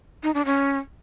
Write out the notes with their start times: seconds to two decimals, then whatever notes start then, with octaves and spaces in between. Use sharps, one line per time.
0.23 D#4
0.34 D4
0.45 C#4